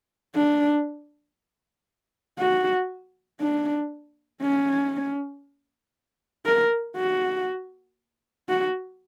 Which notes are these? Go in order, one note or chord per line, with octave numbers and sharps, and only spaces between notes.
D4
F#4
D4
C#4
A#4
F#4
F#4